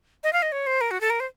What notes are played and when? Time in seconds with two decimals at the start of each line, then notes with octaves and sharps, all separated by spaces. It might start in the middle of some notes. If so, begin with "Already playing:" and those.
0.24 D#5
0.33 F5
0.42 D#5
0.52 C#5
0.67 C5
0.81 A#4
0.91 F#4
1.01 A4
1.10 A#4
1.20 C5